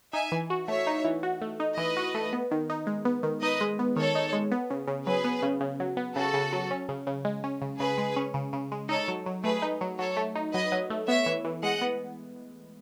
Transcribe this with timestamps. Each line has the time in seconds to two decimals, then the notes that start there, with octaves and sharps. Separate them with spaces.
0.13 D#4 E5 G#5
0.32 E3
0.50 F#4
0.68 A3 C#5 E5
0.87 D#4
1.04 E3
1.23 F#4
1.41 A3
1.60 D#4
1.77 E3 B4 D#5
1.97 F#4
2.15 A3
2.33 B3
2.51 D#3
2.70 D#4
2.87 G#3
3.05 B3
3.23 D#3
3.42 D#4 B4 D#5
3.61 G#3
3.79 B3
3.96 D#3 A4 C#5
4.15 D#4
4.33 G#3
4.51 B3
4.70 C#3
4.88 C#3
5.06 F#3 G#4 B4
5.24 B3
5.43 C#3
5.61 C#3
5.80 F#3
5.97 B3
6.16 C#3 F#4 A4
6.34 C#3
6.53 F#3
6.71 C#4
6.89 C#3
7.07 C#3
7.25 G#3
7.44 C#4
7.62 C#3
7.79 C#3 G#4 B4
7.98 G#3
8.16 C#4
8.34 C#3
8.53 C#3
8.72 G#3
8.89 D#4 A4 C#5
9.08 F#3
9.26 F#3
9.44 A3 G#4 B4
9.62 D#4
9.81 F#3
9.99 F#3 A4 C#5
10.17 A3
10.35 D#4
10.53 F#3 B4 D#5
10.72 F#3
10.90 A3
11.08 B3 C#5 E5
11.26 E3
11.45 E3
11.63 G#3 D#5 F#5
11.82 B3